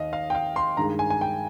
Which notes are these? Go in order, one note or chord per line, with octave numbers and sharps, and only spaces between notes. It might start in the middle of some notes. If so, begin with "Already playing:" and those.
Already playing: D#2 D#5 F5
F5
G5
F5
C6
G2 D#3 G#3 A#5
G#5
G#5
G5